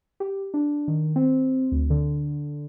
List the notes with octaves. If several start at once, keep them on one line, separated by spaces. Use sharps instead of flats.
G4
D4
D#3
C4
D2
D3